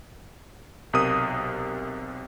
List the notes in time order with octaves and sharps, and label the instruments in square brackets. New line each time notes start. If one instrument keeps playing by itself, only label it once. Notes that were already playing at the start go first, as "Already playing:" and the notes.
[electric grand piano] B1 C3 A#4 D#6